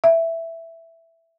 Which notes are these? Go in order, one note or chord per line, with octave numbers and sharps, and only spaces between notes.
E5